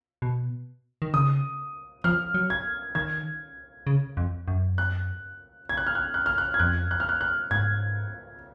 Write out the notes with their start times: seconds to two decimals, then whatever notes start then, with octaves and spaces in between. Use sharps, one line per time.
0.22 B2
1.02 D#3
1.13 C#3 D#6
2.04 F3 F6
2.34 F#3
2.50 G#6
2.95 D#3 G#6
3.87 C#3
4.17 F2
4.48 F#2
4.78 F#6
5.69 G#6
5.77 F#6
5.87 F6
5.95 F#6
6.14 F#6
6.26 F6
6.38 F#6
6.54 G#6
6.59 F2 F#6
6.91 F#6
7.00 F6
7.09 F#6
7.21 F#6
7.51 G#2 G#6